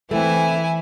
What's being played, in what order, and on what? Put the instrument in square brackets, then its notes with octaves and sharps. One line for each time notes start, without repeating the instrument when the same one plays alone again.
[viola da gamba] E3 [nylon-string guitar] A3 C4 [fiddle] E4 G#5